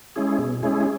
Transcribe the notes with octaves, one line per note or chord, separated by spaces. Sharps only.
G#3 C#4 E4 G#4
B2
G#3 C#4 E4 G#4